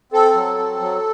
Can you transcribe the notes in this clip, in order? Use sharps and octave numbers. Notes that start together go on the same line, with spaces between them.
C4 A4
F#3
C4
F#3